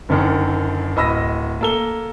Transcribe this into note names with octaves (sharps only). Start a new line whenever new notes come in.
F#1 F#2 D3 D#3
D1 D#5 B5 E6 A#6
A#3 A4 G7